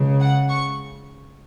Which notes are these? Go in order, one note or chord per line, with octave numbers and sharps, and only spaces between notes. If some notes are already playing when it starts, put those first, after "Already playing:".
Already playing: C#2 C#3
F#5
C#6